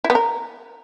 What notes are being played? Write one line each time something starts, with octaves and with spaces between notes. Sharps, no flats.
E4
B3
A#4